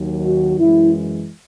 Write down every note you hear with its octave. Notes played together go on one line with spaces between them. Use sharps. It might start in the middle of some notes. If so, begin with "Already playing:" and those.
Already playing: D#2 D#3 F#3
F#4
F#2 E3 G#3 E4